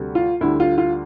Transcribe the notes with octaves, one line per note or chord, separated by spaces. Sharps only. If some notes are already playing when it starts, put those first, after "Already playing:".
Already playing: D2 C3 G3
F4
D2 D3 G3 E4
F4
F4